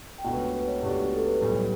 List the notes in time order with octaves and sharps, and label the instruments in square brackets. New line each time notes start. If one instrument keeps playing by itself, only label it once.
[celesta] G5
[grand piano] C#2 B2 A3 D4 [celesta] F#5
[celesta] B4
C#5
B4
C#5
[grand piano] C#2 B2 A3 D4 [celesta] G4
[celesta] G4
A4
B4
[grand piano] B1 A2 G3